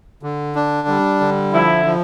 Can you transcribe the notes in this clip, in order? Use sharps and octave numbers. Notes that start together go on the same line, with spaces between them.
D3
D4
G3
D3
F3 E4
F3